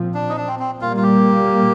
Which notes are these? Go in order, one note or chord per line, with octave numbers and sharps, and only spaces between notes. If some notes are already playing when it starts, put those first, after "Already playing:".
Already playing: A#2 F3 C4
D4
D#4
D4
C4
C4
A#2 G3 A#3 F4
F4
G4